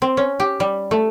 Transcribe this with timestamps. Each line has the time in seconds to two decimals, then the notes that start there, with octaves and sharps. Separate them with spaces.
0.02 C4
0.17 C#4
0.40 G4
0.60 G3
0.91 A3